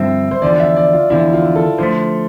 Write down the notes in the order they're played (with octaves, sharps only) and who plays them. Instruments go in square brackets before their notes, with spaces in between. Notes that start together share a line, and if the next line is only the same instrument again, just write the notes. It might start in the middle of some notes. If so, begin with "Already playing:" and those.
Already playing: [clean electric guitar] G2 D3 F3 C4 [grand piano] E5
[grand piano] C5
[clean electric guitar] E2 D3 F3 [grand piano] D5
[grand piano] E5
D5
F4
[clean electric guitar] E2 D3 F3 [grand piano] E4
[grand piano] F4
A4
[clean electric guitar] D3 F3 A3 [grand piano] C5